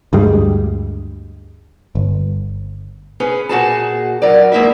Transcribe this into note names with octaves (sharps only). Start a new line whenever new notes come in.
D2 G2 G3 G#3
G1
C#4 G#4 B4
A#2 F#4 G#4 A5
F#3 A#4 D5
E2 G#3 A#3 E4 E5